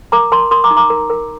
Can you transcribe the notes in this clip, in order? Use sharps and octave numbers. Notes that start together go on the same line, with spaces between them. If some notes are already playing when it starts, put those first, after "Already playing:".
A#4 A#5 D6
A#4 A5 C6
A#4 C6 D#6
A#5 D6
D#4
A#5 D6
A#4
A#4